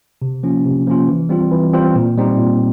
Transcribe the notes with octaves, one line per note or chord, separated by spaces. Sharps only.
C3
F3 A#3 C#4 F4
C3
F3 A#3 C#4 F4
E3
G3 C4 F4
E3
G3 C4 F4
A#2
G3 C4 D#4
A#2